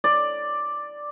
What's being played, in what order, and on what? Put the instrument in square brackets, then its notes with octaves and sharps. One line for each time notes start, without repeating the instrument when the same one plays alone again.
[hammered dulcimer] D5